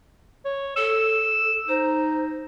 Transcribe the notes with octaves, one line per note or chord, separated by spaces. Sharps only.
C#5
A4 E6
D#4 C5